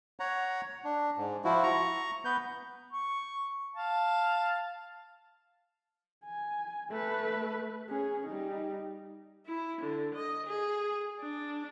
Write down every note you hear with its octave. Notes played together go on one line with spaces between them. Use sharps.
C#5 F#5 A#5
D4
G#2
F3 E4 F#4
A#5 C#6
B3 B4 G6
C#6
F5 A5
G#5
A3 B4
C#4 G#4
G3 D#4
E4
D3
D#5
G#4
D4